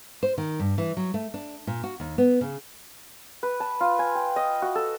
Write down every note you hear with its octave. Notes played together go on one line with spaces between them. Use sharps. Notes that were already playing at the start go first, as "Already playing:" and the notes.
C5
D#3
G2
E3
F#3
A3
D4
A#2
F#4
D#2
B3
C#3
B4
A5
F4
G#5
G5
D#5
F#4
A4